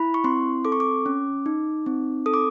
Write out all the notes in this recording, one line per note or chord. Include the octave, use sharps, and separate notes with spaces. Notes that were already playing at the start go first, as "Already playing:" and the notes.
Already playing: E4 B5
C#6
C4 C6
A4 D6
C#6
D6
C#4
D#4
C4
A4 D#6
D6